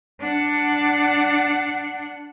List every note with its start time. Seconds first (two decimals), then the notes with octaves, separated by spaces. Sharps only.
0.21 D4 F#5